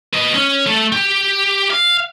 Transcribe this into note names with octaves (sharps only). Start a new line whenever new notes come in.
B4 D#5
C#4
A3
G4
F5